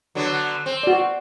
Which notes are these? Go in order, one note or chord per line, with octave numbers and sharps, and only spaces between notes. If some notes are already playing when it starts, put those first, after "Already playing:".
D3 F#3 B3
C4
F#4 D5